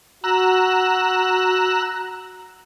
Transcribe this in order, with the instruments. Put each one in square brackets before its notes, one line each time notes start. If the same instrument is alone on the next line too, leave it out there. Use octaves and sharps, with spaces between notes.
[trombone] F#4 [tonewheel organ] A#5 E6 F#6